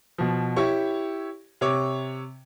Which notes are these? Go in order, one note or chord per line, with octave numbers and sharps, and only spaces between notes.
B2 F3
E4 G4 C#5 C#6
C3 C#5 D6